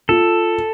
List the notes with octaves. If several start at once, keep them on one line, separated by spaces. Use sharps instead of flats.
F4 A4